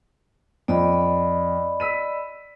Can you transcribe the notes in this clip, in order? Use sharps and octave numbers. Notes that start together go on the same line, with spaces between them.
F2 D5 D#5 B5
E6 B6 D#7